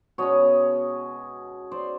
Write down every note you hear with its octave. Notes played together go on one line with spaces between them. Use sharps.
B2 G#3 C#4 C#5 D#5
C5 D5